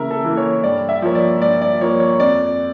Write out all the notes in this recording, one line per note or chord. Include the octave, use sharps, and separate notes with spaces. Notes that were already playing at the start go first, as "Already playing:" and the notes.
Already playing: C#3 E3 A#3 A#4 E5
A4
E3 A#3
C#5
G2 D5
E5
F3 A#3 C#5
D5
G2 D5
D5
F3 A#3 C#5
C#5
F2 D5